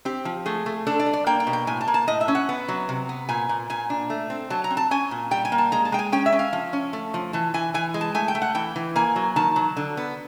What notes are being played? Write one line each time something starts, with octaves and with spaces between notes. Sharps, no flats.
C4 G4
F3
A3 G#4
A3
D4 A4
D5
G3
D5
A#3 G5
G5
B2
G5
A2 G#5
A5
A#3
A5
A2 D#5
E5
C#4
F#5
B3
F#3
C3
B3
A#2 G#5
A#2
A#2 G#5
D4
A3
C4
F#3 A5
A#5
C4
A5
C#4 G#5
A#2
G3 G5
G#5
A#3
A5
G#3 A#5
A5
G#3 G5
G#5
C#4 G5
E5
C#4
F5
F3
C#4
A3
F3
E3 A5
E3 G#5
E3 G#5
G#3
A5
A3 G#5
G5
A3
F#5
E3 G5
E3
A#3 G#5
F#3
D#3 A5
F#3
D3
B3